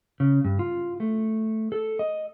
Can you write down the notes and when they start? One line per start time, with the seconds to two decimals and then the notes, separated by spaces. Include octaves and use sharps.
0.20 C#3
0.45 G2
0.59 F4
1.00 A3
1.72 A4
1.99 D#5